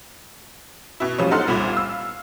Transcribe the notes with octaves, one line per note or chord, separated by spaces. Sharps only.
B2 E4
A2 F3 G3 C#4
B3 D#4 A4 F#5 C6 F6
C2 A#2 B5
F5 E6